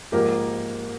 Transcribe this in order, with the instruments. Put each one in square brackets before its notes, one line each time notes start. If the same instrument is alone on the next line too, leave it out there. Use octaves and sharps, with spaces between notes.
[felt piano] G#2 F3 A#3 G4 A#4